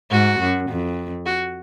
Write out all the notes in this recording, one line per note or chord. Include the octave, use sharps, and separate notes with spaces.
G#2 F#4
F#2
F2
F#4